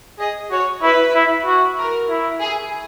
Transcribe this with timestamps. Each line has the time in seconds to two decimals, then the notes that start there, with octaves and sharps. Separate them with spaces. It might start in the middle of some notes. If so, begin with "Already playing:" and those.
0.19 G#4 D#5
0.51 F#4 C#5
0.82 E4 B4
1.15 E4
1.46 F#4
1.77 A#4
2.09 E4
2.41 G#4